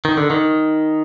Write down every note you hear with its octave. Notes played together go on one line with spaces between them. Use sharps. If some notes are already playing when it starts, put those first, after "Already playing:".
D#3
D3
D#3